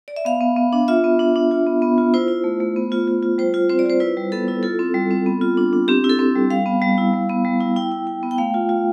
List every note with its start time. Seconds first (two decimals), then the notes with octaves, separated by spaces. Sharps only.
0.08 D5
0.16 E5
0.25 B3 F5
0.41 B3
0.56 B3
0.73 D4
0.88 F4 E5
1.04 B3
1.19 D4
1.36 D4
1.51 F4
1.67 B3
1.82 B3
1.98 F4
2.14 E4 C5
2.28 E4
2.44 A3
2.60 A3
2.76 B3
2.92 F4
3.08 F4
3.23 F4
3.38 G3 C5
3.54 F4
3.70 C4 C5
3.79 D5
3.85 F4 C5
4.00 E4 B4
4.17 G3
4.32 B3 A4
4.48 E4
4.63 F4 A4
4.79 C4
4.94 G3
5.11 C4
5.26 B3
5.41 F4
5.57 D4
5.73 D4
5.88 C4 G4
6.04 E4
6.10 A4
6.19 C4
6.35 G3
6.50 G3 F5
6.66 B3
6.82 G3
6.98 E4
7.13 G3
7.29 B3
7.45 G3
7.61 E4
7.76 E4 G5
7.91 E4
8.07 E4
8.23 B3
8.31 G5
8.38 A3 F5
8.54 F4
8.69 F4